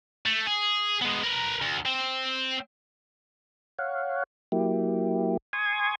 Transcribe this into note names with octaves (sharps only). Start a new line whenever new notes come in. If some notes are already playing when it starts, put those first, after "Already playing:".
A3
G#4
G#3 B3
A#4 B4
D2
C4
C#5 F5 F#5
F#3 A#3 E4 G4
G#5 C6 C#6 D#6 G#6